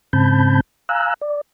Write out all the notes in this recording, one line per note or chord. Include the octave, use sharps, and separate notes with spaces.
G#2 C#3 C4 A5 B5 G6
F5 G#5 A#5 E6 F#6
D5